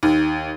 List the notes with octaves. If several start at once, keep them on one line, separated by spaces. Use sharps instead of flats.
D#2